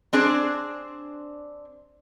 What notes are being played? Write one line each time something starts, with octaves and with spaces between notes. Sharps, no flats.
C4 D4 G#4 C5 D5